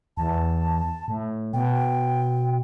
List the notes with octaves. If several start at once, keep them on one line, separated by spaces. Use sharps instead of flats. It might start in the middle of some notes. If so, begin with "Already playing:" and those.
E2 A5
A2
B2 G5